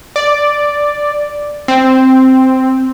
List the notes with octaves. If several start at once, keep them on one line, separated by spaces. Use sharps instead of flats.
D5
C4